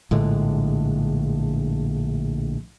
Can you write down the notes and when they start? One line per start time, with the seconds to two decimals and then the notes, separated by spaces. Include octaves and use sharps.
0.11 A#1 A2 D3 G#3